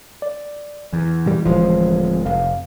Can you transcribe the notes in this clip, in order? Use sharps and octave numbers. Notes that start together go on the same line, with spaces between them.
D5
E2 E3
G3
D1 F3 G#3
F1 F5